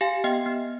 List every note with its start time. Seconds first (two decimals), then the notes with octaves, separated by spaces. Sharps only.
0.01 G4 F5 G#5
0.24 B3 D#5 G5
0.46 B3